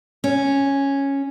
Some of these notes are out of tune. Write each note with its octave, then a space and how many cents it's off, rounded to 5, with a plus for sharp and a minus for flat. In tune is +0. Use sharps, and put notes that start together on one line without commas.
C#4 -5